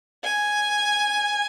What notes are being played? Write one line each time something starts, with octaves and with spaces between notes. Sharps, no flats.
G#5